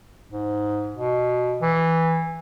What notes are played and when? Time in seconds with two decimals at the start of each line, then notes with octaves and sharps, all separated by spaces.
0.30 G#2
0.95 B2
1.61 E3